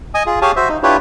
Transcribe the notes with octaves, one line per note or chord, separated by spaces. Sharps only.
D#5 G#5 D#6
F4 G#4
G4 G#4 C#5 F5 G#5 A5
F#4 C5 E5
D#4
D4 E4 F4 G4 B4 C#5